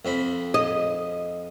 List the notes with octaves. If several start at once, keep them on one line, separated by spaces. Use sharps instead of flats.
F2 C4 B5
D#5